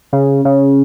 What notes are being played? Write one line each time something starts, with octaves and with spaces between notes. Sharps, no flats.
C#3
C#3